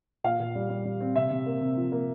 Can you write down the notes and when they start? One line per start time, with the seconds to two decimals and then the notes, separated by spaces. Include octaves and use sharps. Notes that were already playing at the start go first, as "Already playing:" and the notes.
0.24 A#2 F5
0.40 A#2
0.55 G3
0.70 G3
0.85 G3
1.01 C4
1.16 C3 E5
1.31 C3
1.46 A#3
1.61 C3
1.77 F3
1.92 A#3